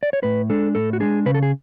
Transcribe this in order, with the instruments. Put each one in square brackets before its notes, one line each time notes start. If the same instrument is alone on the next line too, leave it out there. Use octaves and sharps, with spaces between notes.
[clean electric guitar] D5
C#5
A2 B4
G#3 D4 A4
A2 A4
F#4
G#3 D4 G#4
C#3 B4
A4
G#4